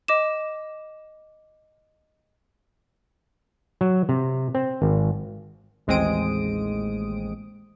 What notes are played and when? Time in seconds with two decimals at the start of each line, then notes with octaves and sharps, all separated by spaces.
0.08 D#5 D6 E7
3.81 F#3
4.09 C3
4.55 C4
4.82 G#1
5.87 A1 D#2 G#3 C4 D#6 D7